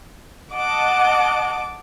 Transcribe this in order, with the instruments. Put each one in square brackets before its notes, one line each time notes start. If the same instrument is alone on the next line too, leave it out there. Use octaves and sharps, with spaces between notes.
[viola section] D#5 F#5 A5 [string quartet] D6